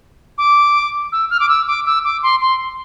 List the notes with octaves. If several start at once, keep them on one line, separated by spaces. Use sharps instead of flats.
D6
E6
F6
D6
E6
D6
E6
D6
C6
C6